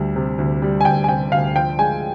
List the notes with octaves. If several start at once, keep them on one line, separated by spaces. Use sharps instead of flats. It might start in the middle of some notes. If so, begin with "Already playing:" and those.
Already playing: D2 G3
C3
D2
G3
G#5
D2 G5
G#5
C3 G5
D2 F5
F3 G5
G#3 G#5